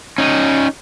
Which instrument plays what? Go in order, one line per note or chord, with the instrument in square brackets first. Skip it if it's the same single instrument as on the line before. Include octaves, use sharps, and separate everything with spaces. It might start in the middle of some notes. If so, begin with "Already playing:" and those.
[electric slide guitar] C#4 D#4